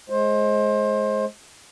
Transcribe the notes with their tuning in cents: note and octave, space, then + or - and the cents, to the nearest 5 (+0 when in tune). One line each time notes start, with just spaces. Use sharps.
G#3 +20 C5 +25